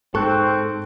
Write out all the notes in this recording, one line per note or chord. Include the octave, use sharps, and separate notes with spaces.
G#2 C4 A4 C#6 F#6